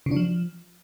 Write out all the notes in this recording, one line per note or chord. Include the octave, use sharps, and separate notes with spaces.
C#3
D4
F3